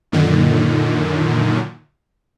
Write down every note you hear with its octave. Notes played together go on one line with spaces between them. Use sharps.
F#2 A#2 D3 D#3